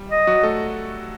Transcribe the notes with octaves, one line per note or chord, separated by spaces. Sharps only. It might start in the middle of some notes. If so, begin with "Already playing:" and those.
Already playing: G3
D#5
F#3 F#4
A3 A4